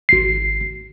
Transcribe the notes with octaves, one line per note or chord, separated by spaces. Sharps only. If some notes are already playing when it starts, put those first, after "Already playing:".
G#1 C7